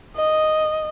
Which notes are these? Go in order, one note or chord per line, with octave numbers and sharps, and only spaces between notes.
D#5